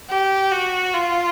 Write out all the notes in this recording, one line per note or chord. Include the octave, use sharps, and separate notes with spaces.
G4
F#4
F4